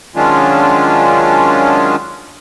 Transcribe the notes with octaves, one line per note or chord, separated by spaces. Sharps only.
D#3 F#3 G#3 C#4 D4 F4